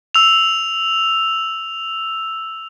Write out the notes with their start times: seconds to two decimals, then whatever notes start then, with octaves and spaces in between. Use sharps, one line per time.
0.15 E6 F7